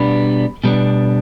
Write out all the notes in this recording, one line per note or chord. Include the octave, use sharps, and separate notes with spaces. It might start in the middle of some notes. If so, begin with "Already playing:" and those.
Already playing: B2 G3 B3 D4 B5
B2 G3 B3 D4